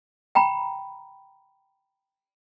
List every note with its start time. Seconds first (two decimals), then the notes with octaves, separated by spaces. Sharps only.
0.35 G5 A#5 B5